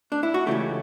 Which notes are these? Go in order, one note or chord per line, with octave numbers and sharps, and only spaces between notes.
D4
E4
F#4
C#2 C#3 E3 A3 G4